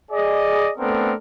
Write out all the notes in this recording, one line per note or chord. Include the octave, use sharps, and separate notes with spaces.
G#4 D5 D#5
A3 B3 C4 D4 A4 A#4